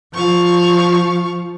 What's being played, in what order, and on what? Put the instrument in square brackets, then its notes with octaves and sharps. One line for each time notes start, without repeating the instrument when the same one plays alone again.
[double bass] F3 [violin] F5 C#6